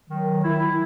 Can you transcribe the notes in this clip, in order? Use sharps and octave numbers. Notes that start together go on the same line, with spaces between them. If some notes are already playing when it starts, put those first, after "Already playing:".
D#3 F#3
E4